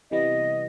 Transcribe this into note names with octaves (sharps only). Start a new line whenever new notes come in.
C3 E3 G3 B3 D#5